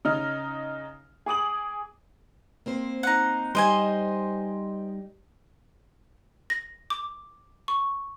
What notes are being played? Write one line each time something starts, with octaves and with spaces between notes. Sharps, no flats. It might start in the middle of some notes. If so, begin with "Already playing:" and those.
C#3 D#4 F6
G#4 D6 D#6 F#7
A#3 C4 C5
D#4 F#5
G3 D#4 C5 D#5 G#5
A#6
D6
C#6